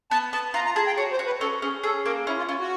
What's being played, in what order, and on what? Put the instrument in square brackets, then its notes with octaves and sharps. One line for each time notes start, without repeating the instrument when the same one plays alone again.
[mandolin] B3 [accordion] A5
[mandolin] B3 [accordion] A5
[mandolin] F4 [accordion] A#5
[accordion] A#5
[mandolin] G#4 [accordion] A5
[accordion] G5
[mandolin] F#4 [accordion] C#5
[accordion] C5
[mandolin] F#4
[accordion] B4
[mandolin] C#4 [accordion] A4
[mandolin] C#4 [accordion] G#4
[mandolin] G#4 [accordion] A4
[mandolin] A#3 [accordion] A#4
[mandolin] C#4 [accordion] E4
[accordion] F4
[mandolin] C#4 [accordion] F4
[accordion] F#4